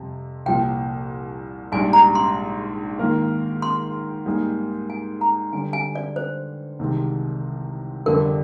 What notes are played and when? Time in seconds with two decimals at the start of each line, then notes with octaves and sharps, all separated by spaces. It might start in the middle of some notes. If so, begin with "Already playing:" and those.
Already playing: F2 C3 G3
0.46 C2 A#2 F3 G5
1.72 A#1 G#2 G3 D4 G#5
1.93 A#5
2.15 C6
2.99 G#2 D#3 A#3 F4 A#4
3.62 C6
4.26 G#2 G3 A#3 D#4 G#4
4.90 G#5
5.21 A#5
5.52 G2 D3 G3 G#5
5.73 G#5
5.95 D5
6.16 C5
6.79 C2 C3 D#3 G#3 C4
8.06 G1 F2 D3 G3 D4 A#4